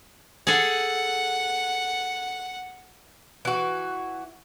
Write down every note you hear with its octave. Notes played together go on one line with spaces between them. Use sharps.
G#4 A4 F#5
E3 F#4